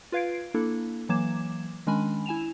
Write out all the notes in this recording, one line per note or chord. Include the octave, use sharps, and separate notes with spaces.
F4 B4 F5 G#6 C7 D7
A#3 D4 E4 A4
E3 F#3 A#3 D6 G#6 E7
D#3 G#3 C#4 D4 G#5 B5
E4 G#5 E7 F7